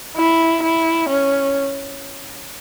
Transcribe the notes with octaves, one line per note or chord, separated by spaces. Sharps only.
E4
E4
C#4